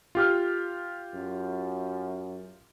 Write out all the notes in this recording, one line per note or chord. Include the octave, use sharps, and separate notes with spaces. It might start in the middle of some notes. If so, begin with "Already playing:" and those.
F4 G4 F6
F#2